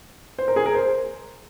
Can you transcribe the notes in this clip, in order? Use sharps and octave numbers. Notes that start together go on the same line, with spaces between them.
C5
A#4
G#4
A#4
C5